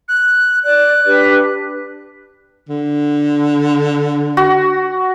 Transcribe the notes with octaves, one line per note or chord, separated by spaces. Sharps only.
F#6
D5 F#6
D4 G4 B4
D3
F#4